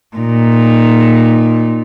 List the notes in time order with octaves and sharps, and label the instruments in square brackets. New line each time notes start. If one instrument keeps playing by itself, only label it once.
[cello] A#2 D#4